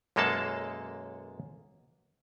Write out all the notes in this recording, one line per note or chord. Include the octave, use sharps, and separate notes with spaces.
B1 F#2 G#3 A#3 A4 A5